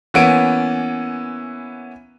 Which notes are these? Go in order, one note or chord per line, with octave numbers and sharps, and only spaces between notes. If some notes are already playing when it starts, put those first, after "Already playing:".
E3 A#3 B3 C#4 D7